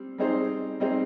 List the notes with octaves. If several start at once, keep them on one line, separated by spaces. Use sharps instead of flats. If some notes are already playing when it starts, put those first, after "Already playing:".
Already playing: G3 C4
G3 C4 D#4 G#4 C5
G3 C4 D#4 G#4 C5